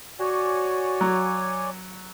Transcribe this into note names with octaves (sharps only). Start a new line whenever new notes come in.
F#4 C#5 D5 G#5
F#3